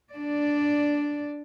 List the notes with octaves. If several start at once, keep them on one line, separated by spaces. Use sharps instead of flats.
D4 D5